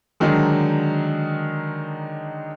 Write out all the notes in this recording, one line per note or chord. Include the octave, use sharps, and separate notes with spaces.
D3 D#3 F#3 G#3 D4 D#4